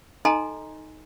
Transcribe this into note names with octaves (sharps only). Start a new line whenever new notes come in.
D#4 A4 D#5 G#5 A#5 C6